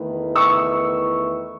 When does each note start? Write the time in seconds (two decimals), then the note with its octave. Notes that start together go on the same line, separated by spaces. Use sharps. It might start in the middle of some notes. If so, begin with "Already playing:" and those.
Already playing: E2 D#3 A3 E4 B4
0.36 C#6 E6